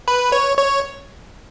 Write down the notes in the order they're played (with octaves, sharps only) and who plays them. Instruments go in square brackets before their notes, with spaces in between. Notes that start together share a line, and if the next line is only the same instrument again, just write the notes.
[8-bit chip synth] B4
C#5
C#5